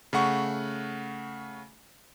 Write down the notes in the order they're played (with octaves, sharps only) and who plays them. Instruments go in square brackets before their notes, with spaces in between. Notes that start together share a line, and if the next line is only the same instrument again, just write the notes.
[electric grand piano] C#3 A3 F#5 C#6